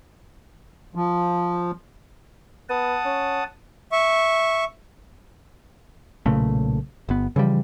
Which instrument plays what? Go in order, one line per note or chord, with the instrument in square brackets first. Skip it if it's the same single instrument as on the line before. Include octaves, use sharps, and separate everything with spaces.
[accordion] F3
[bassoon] B3 [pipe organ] F#5 A5 D#6
[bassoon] C#4
[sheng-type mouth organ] E5 C#6
[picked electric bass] B1 A#2 C#3 A3
G1 B3
C#3 E3 F3 G3